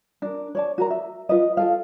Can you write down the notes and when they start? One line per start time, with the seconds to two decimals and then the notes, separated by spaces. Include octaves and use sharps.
0.22 D4 A#4
0.55 C#5 D5 A5
0.78 F#4 A#4 A#5
0.90 E5
1.29 F4 B4 D#5
1.57 F4 A4 F5